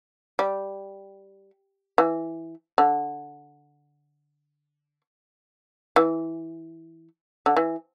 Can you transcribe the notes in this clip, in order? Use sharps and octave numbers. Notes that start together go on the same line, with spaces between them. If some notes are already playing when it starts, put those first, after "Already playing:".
G3
E3
D3
E3
D3
E3